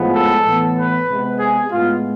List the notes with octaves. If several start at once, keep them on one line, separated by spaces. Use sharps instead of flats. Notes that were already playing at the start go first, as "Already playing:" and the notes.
Already playing: A2 F3 G#3 B3
A4
A2 E3 B3
B4
C3 G#3 B3
G#4
A2 G#3 B3 F4